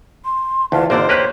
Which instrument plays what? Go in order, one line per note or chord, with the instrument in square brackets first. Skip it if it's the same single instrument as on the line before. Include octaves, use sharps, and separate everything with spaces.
[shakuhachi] C6
[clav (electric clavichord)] D2 [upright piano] E3 F4 [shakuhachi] A5
[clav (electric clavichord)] G#1 D3 [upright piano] A#3 A#4 D5 [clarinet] C5 [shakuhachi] D#5
[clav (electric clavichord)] A#3 G4 B4 [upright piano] C#5 F#6